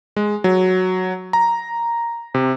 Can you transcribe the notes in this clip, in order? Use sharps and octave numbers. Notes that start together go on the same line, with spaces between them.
G#3
F#3
A#5
C3